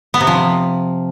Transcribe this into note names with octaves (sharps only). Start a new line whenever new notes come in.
B3
C3
F3